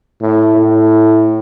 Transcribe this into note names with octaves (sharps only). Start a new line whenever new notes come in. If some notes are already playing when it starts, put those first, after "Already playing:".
A2
A2